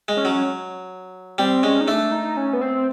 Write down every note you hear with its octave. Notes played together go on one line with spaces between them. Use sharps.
G#3
C#4
F#3
G3 C4
G#3 C#4
D#4
A3 D4
D#4
C#4
B3
C4